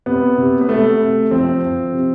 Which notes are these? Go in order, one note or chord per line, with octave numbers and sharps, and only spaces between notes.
C3 B3
C3
B3
C3 A3
C3
F3 C4
F3
C3